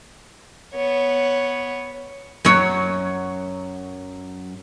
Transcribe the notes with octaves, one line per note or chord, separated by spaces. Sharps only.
B3 C#5
F#2 F#3 C#5